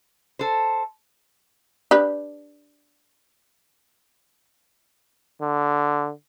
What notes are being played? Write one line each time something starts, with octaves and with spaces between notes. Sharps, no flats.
A4 C5
D4 G4 B4
D3